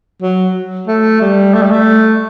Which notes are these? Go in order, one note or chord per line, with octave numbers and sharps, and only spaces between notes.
F#3
A3
G3
A3
G3
A3